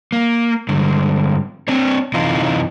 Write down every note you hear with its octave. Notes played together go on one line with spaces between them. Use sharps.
A#3
G2 D3 G#3
C4 D4 C#5
F#2 C3 E3 D#4 F4